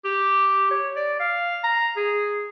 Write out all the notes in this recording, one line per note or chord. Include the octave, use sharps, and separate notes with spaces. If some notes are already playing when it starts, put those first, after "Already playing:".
G4
C#5
D5
F5
A#5
G#4